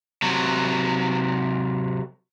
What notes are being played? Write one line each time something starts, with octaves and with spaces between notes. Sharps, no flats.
C3 F#3